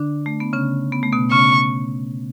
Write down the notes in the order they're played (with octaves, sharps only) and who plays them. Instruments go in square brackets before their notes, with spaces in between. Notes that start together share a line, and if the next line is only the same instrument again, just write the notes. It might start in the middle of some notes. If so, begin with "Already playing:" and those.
Already playing: [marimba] D3 D4
A3
B3
C#3 C#4
B3
A3
B2 B3
[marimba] C#3 C#4 [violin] C#6